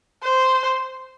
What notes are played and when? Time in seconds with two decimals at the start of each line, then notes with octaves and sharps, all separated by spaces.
0.23 C5